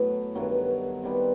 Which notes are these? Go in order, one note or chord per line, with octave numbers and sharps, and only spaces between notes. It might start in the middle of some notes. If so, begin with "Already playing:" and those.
Already playing: A2 F#3 B3
G2 D#3 F#3 B3
C3 D#3 G3 B3